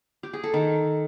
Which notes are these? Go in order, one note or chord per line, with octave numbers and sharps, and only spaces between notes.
G4
G#4
A4
D#3